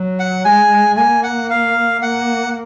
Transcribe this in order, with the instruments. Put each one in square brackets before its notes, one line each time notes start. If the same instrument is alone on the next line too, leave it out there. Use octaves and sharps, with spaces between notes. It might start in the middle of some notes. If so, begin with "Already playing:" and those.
Already playing: [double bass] F#3
[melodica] F#5
[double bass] G#3 [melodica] G#5
[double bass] A#3 [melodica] G#5
[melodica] F#5
F5
[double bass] A#3 [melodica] F#5